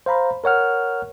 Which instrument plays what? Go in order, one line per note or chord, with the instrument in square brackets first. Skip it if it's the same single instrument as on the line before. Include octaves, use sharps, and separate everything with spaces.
[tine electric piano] C5 F5 A#5 B5
A#4 C#5 F#5 F6